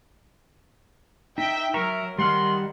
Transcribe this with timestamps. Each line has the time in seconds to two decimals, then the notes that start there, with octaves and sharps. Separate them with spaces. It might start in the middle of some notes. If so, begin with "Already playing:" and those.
1.38 D#4 E5 G5
1.74 F#3 A#4 E5 A#5 C#6
2.19 D#3 G3 F#5 C6 F6